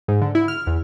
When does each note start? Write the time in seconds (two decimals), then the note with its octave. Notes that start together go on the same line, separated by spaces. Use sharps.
0.08 G#2
0.21 D3
0.35 E4
0.48 F6
0.67 E2